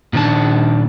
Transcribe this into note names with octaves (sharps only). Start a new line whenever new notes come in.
A#2 D#3 D4 A5